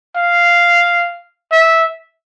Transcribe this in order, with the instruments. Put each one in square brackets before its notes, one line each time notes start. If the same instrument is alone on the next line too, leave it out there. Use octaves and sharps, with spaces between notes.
[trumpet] F5
E5